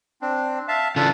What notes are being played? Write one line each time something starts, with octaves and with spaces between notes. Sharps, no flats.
C4 D4
E5 F5 A5
C#3 E3 D4 F4 A4